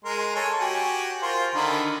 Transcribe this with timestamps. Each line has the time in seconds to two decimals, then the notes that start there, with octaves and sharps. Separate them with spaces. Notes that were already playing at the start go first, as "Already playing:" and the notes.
0.05 G#3 A#4 C6
0.36 A4 C#5 G#5
0.60 F#4 G4 G#5
1.21 F4 A#4 C5
1.55 D3 D#3 B5